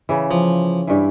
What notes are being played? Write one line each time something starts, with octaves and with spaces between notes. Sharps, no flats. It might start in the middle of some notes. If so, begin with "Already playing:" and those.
C#3 E3
F3
G2 E3